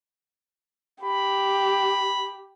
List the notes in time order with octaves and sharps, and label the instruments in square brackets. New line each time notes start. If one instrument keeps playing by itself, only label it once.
[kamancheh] G4 [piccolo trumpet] B5